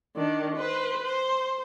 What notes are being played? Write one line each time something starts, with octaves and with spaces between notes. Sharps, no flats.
D#3 D4
B4 C5
C5